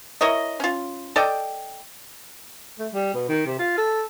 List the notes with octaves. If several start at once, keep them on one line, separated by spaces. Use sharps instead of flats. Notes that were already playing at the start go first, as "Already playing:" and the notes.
E4 A#4 C#5 D#5
C#4 F4
A4 D5 D#5 G5
A3
G3
B2
D#3
C3
F4
A4